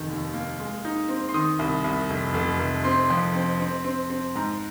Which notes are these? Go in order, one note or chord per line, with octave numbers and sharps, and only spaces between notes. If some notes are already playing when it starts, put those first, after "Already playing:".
Already playing: F1 D#3
D#2
A#3
G#3
D#4
C4
C6
D#3 D#6
C2
C2
F1
F1
F1
C4 C6
F2
C4
C4
C4
C4
G#2 A#5